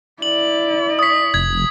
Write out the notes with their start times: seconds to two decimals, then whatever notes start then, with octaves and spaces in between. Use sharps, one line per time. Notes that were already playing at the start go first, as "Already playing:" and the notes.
0.22 E4 D5 F#7
0.99 D#6 B6
1.34 F1 G#6